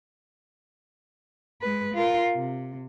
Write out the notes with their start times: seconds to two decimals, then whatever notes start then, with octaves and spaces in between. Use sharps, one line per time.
1.62 G#3 B4
1.94 F4 A#4
2.35 C3